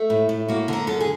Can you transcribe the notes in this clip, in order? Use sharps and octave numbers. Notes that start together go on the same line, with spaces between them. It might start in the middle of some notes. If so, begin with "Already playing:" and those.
Already playing: A3
A2
A2
A#3 F#4
D3 A#4
F#2 A4
G#4